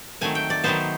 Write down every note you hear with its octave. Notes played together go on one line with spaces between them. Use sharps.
D#3 F#3 A3 C4 G#5
G5
D5
D#3 F#3 B3 C5